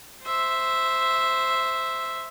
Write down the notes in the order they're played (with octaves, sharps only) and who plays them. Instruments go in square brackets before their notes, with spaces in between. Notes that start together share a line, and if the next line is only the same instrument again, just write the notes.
[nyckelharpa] C5 E5